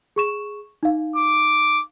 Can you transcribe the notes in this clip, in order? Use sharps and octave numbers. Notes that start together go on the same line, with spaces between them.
G#4 C#6 E7
D#4 F5
D6